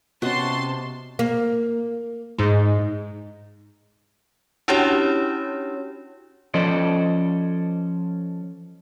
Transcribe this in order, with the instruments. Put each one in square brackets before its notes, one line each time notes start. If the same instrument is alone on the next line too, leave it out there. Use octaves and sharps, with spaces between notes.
[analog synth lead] C3 [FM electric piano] B3 C#4 [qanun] F#4 D#5 [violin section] A5 C6
[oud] A#3
[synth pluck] G#2 G#3
[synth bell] C#4 D4 E4 F#4 G4 C#5
[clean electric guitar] F3 C#4 A4 C5 D5 D#5